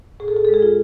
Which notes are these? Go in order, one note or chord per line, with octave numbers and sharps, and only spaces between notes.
A2 G#4
A4
G#4
A4
G#3
G#4
F4